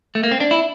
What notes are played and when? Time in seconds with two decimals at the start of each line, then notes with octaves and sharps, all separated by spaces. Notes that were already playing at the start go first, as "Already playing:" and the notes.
0.15 A3
0.23 A#3
0.32 C4
0.40 D4
0.51 E4